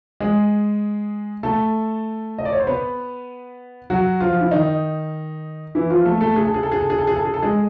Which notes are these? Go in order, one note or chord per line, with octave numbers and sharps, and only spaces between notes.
G#3 G#4
A3 A4
D#5
D5
C#5
C5
B3 B4
F#3 F#4
F3 F4
E4
D#3 D#4
E3 E4
F3 F4
A3 A4
A3 A4
G#4
A4
G#4
A4
G#4
A4
G#4
A4
G#4
A4
G#4
A4
G#3 G#4